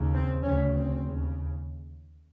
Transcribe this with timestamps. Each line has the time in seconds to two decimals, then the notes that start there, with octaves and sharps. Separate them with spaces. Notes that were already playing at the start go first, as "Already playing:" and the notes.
Already playing: D#2 C#3
0.14 C4
0.43 D2 C#3 C#4
0.72 C4
1.01 D#2 C#3